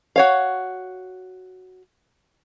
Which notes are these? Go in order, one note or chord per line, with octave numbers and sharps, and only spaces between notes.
F#4 C#5 F5